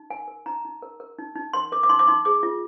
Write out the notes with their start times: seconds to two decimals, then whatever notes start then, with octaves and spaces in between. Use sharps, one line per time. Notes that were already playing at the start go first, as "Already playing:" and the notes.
Already playing: D#4
0.10 A#4 G#5
0.28 A#4
0.46 D#4 A#5
0.65 D#4
0.82 A#4
1.00 A#4
1.18 D#4
1.36 D#4
1.53 A#4 C6
1.72 A#4 D6
1.83 D6
1.89 D#4 C6
1.99 D6
2.07 D#4 C6
2.25 G#4 D6
2.43 F4